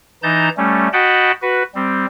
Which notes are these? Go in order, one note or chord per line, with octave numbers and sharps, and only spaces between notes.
E3 D#4 A5 A#5 G6
G3 A3 C#4
F#4 D#5 F#5 G5 A5 B5
F#4 B4
G3 C4